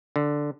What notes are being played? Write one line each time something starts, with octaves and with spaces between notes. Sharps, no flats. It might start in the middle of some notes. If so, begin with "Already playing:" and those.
D3